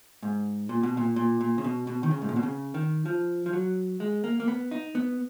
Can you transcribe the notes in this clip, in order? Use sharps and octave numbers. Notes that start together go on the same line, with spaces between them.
G#2
A#2
B2
A#2
A#2
A#2
C#3
B2
B2
D#3
C#3
G#2
A#2
B2
C#3
D#3
F3
F3
F#3
G#3
A#3
A#3
B3
D#4
B3